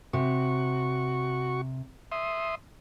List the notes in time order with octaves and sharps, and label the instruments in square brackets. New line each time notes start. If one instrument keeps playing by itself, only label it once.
[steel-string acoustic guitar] C3 [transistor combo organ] F#4 C#6
[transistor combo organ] E5 C6 D#6